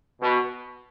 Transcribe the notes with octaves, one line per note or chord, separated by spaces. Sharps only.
B2